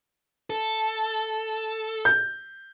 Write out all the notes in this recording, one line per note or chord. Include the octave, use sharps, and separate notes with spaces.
A4
G6